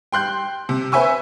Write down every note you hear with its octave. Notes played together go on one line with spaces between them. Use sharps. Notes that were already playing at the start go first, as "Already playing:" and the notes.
G5 C6 F#6 G6
C3
B4 C5 E5 G#5 C#6 E6